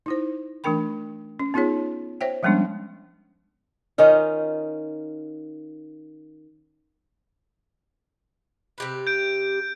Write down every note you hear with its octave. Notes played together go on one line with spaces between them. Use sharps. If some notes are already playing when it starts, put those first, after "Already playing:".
D#4 E4 C5
E3 A3 D4 A#4 G5 B5
C#4
B3 D#4 F4 G#4 C#5
C5 C#5 E5 G5
F3 G3 G#3 B3 C#4 D4
D#3 C#4 D#4 F4
C3 G4 B4
G6 D7